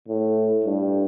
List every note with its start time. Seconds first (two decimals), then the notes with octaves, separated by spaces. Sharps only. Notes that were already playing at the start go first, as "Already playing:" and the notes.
0.08 A2
0.66 G2